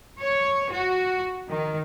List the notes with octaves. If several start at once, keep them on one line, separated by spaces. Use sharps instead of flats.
C#5
F#4
D#3